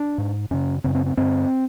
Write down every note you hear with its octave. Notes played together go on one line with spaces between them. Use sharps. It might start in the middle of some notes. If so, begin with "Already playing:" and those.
Already playing: D4
G#2
F#2 C#3 C#4
F#2 C#3 C4
C4
C4
G2 D3 C4